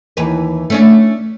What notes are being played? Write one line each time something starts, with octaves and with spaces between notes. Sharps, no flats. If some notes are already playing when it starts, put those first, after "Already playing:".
D#2 E3 B4
A3 C#4 D4